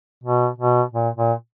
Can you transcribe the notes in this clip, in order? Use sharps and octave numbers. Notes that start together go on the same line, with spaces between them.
B2
B2
A#2
A#2